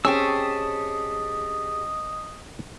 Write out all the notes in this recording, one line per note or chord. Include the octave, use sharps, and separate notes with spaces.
C4 C#4 G4 G#4 D#5 A5 C#6 E6